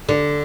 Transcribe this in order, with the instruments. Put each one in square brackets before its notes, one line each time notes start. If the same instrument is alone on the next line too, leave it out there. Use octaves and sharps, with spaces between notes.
[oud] D3